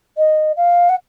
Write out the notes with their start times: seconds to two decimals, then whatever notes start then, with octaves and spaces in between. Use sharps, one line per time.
0.17 D#5
0.56 F5
0.89 F#5